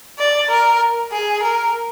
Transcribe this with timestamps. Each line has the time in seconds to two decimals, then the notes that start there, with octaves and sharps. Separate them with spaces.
0.19 D5
0.50 A#4
1.12 G#4
1.43 A#4